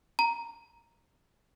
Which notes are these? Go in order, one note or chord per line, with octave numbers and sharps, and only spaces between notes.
A#5